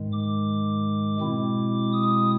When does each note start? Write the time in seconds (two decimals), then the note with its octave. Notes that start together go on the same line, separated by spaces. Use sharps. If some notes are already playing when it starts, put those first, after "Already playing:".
Already playing: G#2 D#3 G#3
0.12 D6
1.20 B2 G#3 C4 E4
1.93 D#6